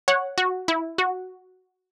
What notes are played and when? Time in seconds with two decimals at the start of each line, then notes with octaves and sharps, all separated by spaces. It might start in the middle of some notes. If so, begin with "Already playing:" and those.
0.08 C#5 F#5
0.38 F#4
0.68 E4
0.98 F#4